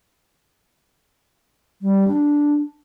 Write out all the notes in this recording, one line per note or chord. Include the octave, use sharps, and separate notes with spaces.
G3
D4